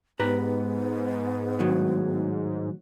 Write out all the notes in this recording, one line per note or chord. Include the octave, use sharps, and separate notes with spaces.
G#2 B3 G4 B4 A#5
A2 D#3 F#3